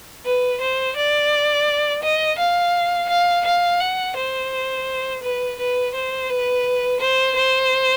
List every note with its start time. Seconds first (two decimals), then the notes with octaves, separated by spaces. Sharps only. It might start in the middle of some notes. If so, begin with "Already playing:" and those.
0.26 B4
0.61 C5
0.97 D5
2.03 D#5
2.38 F5
3.09 F5
3.45 F5
3.80 F#5
4.17 C5
5.23 B4
5.59 B4
5.94 C5
6.30 B4
7.00 C5
7.36 C5